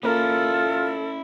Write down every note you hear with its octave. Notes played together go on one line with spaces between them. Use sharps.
A#3 C#4 E4 F4 A4 A#4